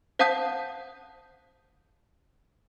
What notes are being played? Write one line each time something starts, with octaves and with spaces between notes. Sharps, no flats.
C5 F5 F#5 A5 D#6 G6